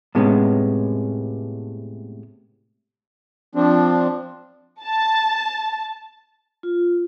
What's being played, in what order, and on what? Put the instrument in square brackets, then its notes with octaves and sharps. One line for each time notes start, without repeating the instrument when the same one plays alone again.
[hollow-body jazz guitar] A2 C3 G#3 B3 C#4
[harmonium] F3 C4 D4
[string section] A5
[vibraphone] F4